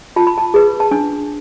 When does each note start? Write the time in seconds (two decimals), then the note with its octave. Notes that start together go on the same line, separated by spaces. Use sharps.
0.16 F4 A5
0.27 B5
0.38 A5
0.54 G#4 B4
0.80 A5
0.91 D4 G#5